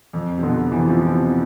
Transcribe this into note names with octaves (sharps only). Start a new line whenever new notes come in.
F2
C3
B2 D3
C3 E3
F3
C3 E3